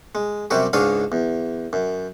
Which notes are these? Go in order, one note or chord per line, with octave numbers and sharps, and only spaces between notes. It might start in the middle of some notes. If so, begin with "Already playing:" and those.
G#3
F#2 C3 G3 F#4 G4
C#2 G#2 D4 G#4 C#5 F5
E2
F#2